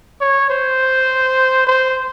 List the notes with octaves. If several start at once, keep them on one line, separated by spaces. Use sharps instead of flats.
C#5
C5
C5